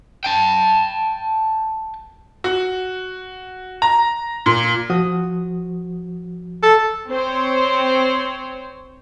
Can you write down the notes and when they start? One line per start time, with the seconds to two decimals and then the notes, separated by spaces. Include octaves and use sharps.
0.24 G5 A5
2.44 F#4
3.82 A#5
4.46 A#2
4.90 F3 F#4 D#6
6.62 A4
7.09 C4 C5 C#5